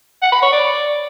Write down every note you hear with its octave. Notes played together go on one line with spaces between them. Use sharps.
F#5
B5
C#5
D5